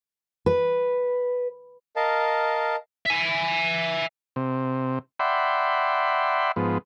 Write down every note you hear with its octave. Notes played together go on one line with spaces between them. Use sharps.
B4
A#4 D#5 F5 A5
E5 G#5
C3
D5 E5 F#5 G5 B5 C6
G#2 F3 B3